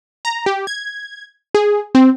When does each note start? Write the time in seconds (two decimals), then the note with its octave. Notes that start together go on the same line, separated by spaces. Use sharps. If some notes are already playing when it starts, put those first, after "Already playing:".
0.25 A#5
0.46 G4
0.67 G#6
1.55 G#4
1.95 C4